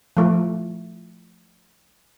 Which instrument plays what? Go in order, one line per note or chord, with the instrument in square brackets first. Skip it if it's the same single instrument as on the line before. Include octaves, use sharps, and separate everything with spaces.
[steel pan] F3 A3